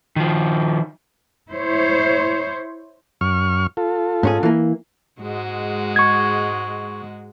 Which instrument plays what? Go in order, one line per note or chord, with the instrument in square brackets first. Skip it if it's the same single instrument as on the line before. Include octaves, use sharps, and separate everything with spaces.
[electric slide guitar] D#3 F3
[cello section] E4 C5 C#5
[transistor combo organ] F#2 C#6 F6
F4 A4
[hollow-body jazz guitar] G#2 C#4 G#4
E3 A#3
[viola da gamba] G#2 G#3 F#4
[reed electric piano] C#6 G#6